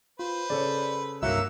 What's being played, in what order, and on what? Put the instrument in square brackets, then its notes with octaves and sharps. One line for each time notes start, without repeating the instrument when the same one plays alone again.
[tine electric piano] F4 [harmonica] B4 C5
[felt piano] C#3 A4 C#5 [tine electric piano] D5
[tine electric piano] C2 G2 [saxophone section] F#3 A#3 E5 [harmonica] D#4 F#5 E6